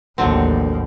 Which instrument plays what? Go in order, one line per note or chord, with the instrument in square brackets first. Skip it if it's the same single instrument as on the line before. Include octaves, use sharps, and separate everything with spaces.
[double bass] A1 D#2 [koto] D3 F#3 C4